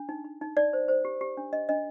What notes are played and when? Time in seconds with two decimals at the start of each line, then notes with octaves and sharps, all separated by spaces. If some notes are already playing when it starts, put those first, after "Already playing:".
Already playing: D4
0.09 D#4
0.25 D#4
0.41 D#4
0.57 D#4 D5
0.73 C5
0.88 C5
1.05 G4
1.21 G4
1.37 D4
1.52 D4 D#5
1.69 D4 D#5